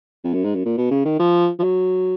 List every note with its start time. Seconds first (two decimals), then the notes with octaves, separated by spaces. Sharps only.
0.24 F2
0.34 F#2
0.44 G#2
0.55 F#2
0.66 A#2
0.77 B2
0.91 C#3
1.05 D#3
1.19 F3
1.59 F3
1.63 F#3